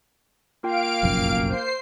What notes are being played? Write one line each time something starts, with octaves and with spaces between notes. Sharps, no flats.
A#3 F4 F5 G5 D7
F1 A#1 F#2
C5 C7